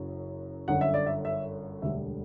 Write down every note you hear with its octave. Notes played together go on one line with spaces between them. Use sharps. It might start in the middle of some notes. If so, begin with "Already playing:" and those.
Already playing: F#1 F#2 F#3
G1 F#2 D3 F#5
E5
D5
E5
E5
E1 D2 D3 G3 E5